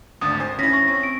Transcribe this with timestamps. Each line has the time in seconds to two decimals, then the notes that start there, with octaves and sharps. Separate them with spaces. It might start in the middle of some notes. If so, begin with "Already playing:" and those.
0.21 G#1 D2 D4 D#6 A6
0.40 C5 G#5
0.59 C#4 E4 A#6 B6
0.73 C#6 A#6
0.88 C4
1.03 D7